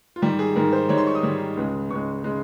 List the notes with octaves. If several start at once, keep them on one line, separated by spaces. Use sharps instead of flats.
F4
G#2 D#3 G3 G4
G#4
G#2 D#3 G3 A#4
C5
G#2 D#3 G3 C#5
C6
C#6
D#6
G#2 D#3 G3
C#2 C#3 G#3
C#2 C#3 G#3 C#6
C#3 G#3